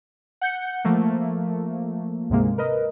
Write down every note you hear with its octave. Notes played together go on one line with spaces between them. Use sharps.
F#5 G6 C#7
F3 A3 A#3
D2 G#2 C3 G#3 A#3
A#4 B4 D#5